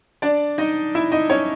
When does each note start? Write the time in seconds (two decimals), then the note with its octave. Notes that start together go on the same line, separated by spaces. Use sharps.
0.22 D4 D5
0.58 D#4 D#5
0.95 E4 E5
1.12 D#4 D#5
1.30 C#4 C#5